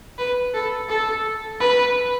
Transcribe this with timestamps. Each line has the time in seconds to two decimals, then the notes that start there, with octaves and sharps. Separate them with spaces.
0.18 B4
0.54 A4
0.89 A4
1.60 B4